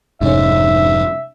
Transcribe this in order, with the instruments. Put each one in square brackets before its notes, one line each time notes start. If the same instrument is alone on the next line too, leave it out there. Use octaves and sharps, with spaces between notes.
[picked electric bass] F1 G#2 [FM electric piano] C#4 D#4 [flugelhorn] E5